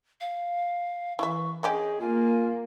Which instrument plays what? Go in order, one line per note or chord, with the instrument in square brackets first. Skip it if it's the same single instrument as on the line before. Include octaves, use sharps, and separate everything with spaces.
[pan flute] F5
[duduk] E3 [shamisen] E4 E5 [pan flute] C#6
[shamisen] D3 C#4 G4 [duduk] G#4 [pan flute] D#5
[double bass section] A#3 [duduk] F4 [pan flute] G#5